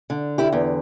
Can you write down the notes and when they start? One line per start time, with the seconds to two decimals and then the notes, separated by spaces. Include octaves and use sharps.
0.10 D3
0.38 E4 G4
0.53 E2